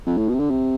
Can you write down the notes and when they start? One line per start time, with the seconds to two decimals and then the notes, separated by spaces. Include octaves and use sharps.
0.06 F2
0.17 A2
0.28 B2
0.34 C3
0.39 D3
0.50 C3